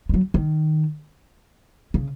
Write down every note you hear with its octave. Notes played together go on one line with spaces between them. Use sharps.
G#3
F#3
D#3
C#3